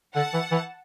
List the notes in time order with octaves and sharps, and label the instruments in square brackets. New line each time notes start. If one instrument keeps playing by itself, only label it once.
[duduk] D3 [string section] F#5 A5
[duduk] E3
E3